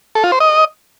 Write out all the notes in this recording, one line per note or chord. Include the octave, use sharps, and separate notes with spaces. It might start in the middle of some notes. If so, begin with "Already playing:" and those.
A4
F4
C5
D#5